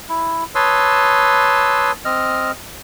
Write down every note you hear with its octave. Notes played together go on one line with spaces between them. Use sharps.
E4
B4 C#5 A5 C6 D#6 E6
C4 D#5 F6